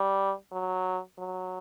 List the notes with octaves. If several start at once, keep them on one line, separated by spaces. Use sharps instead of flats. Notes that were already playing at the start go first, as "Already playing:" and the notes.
Already playing: G3
F#3
F#3